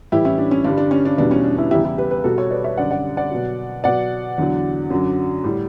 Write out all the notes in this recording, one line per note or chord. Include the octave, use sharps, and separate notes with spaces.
A2 E3 G3 E4 G4
C#4 E4
D4
C#4
G2 D3 G3 D4
D4
C#4
D4
E2 B2 G3 D4
C#4
D4
C#4 E4
E2 C#3 G3 E4 G4
E4 G4
G4 B4
G4 B4
B2 G3 F#4 A4
A4 C#5
B4 D5
C#5 E5
F#2 D3 G3 D5 F#5
D5 F#5
D5 F#5
B2 F#3
B2 F#3 D5 F#5
E2 D3 F#3
F#2 D3 F#3
A2 G3